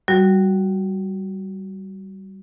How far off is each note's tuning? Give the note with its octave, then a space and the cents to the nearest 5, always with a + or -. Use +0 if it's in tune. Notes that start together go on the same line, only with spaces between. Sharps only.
G3 -20 F#4 +0